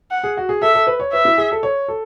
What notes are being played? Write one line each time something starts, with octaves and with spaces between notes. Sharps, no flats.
F#5
G#4
F#4
G#4
A4 E5
A4
B4
C#5
B4 E5
E4
G#4
A4
C#5
A4